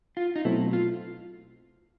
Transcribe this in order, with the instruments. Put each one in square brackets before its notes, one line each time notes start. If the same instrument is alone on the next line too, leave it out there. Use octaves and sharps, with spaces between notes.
[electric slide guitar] F4
D#4
[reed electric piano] B2 F#3 A3 C4 [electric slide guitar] E4
[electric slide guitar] F4